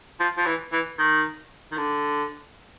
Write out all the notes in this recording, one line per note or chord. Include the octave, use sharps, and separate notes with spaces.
F3
F3
E3
E3
D#3
D#3
D3